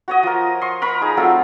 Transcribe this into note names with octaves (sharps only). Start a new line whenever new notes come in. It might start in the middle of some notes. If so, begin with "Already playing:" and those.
F#4 C#5 D#5
F3 A#4
D#5 C6 C#6
A#4 B5 C#6
D#4 G#4
F#3 A3 C4 F4